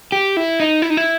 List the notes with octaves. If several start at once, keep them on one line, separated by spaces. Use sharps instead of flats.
G4
E4
D#4
E4
D#4
E4